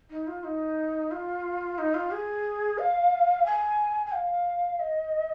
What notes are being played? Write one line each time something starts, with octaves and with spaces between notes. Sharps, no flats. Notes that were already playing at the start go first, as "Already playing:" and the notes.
D#4
F4
D#4
F4
D#4
F4
G#4
F5
G#5
G#5
F5
D#5